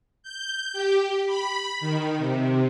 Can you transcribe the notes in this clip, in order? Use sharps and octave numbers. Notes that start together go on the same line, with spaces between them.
G6
G4
B5
D#3
C3